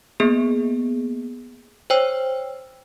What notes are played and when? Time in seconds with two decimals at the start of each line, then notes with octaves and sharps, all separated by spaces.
0.20 A#3 B3 G#4
1.90 C5 C#5 G5 E6